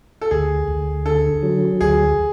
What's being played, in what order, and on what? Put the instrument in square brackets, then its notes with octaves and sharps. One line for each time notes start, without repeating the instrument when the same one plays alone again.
[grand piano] A4
[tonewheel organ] D2 [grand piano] G#4
[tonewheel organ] D2
[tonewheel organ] D3 [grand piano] A4
[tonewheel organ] F#3
[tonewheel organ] D2 [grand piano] G#4